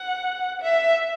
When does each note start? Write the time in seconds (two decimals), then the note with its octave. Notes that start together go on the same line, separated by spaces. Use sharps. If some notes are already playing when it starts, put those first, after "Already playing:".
Already playing: F#5
0.62 E5